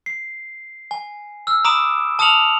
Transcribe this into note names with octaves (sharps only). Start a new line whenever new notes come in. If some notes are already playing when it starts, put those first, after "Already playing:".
C7
G#5
E6 F6
A#5 B5 D6 D#6 D7 E7
A5 D#6 F6 C#7 F7 F#7